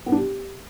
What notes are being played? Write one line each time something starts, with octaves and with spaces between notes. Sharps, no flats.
B3
D4
G4